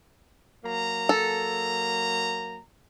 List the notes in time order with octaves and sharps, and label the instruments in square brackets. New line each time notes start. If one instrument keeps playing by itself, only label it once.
[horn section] F#3 A#3 A#5
[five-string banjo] A4